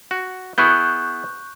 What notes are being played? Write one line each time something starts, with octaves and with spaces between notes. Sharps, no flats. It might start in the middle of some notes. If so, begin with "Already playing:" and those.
F#4
B3 E4 G#4 C#6 F#6 G6